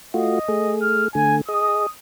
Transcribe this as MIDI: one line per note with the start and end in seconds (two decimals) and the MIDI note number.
0.14 0.39 57
0.14 0.39 65
0.14 0.39 66
0.14 0.75 75
0.48 1.08 57
0.48 1.08 68
0.82 1.06 89
1.15 1.41 50
1.15 1.41 57
1.15 1.36 80
1.48 1.86 68
1.48 1.86 75
1.48 1.88 87